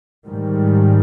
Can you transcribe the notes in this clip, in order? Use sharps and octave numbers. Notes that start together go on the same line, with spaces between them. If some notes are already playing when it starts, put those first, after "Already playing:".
G#2 D#3 G3